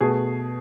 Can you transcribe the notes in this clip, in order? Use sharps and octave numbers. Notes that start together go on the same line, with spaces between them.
B2 A3 G#4